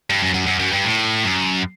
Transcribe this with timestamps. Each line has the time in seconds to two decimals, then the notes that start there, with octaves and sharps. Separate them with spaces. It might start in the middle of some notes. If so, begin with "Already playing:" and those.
0.10 G2
0.23 F#2
0.34 F#2
0.47 F#2
0.60 F#2
0.72 G2
0.85 A2
1.23 F#2